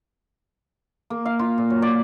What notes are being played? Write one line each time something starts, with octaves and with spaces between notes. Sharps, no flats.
A#3
F5
F4
A#2
F#3
D5